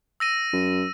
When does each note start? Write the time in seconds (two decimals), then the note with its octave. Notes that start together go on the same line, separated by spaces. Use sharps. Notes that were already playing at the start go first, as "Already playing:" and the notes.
0.20 E6 A#6 D#7
0.53 F#2